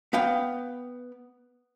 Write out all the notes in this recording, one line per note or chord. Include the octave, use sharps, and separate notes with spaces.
B3 F5 G5